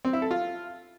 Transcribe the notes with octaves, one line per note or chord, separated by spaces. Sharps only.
C4
E4
A4
F4